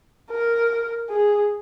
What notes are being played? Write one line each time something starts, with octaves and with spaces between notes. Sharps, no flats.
A#4
G#4